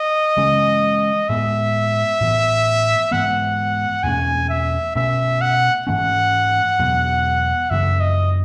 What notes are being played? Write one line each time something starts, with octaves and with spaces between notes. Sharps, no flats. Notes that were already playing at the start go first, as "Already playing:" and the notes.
Already playing: D#5
C#3 E3 G#3 C#4
A2 G#3 B3 E5
A2 E3 B3
G#2 E3 B3 F#5
E2 B2 A3 C#4 G#5
E5
B2 A3 C#4 E5
F#5
G#2 E3 A3 C#4 F#5
E2 B2 F#3 B3
F#2 C#3 E3 A3 E5
D#5